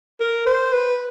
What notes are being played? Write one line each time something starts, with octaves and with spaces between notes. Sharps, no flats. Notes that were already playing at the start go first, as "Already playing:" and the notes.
A#4
C5
B4